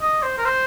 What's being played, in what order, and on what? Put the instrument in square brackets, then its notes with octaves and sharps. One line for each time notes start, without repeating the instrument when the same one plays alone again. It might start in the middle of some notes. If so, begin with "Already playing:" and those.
[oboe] D#5
C5
A#4
C5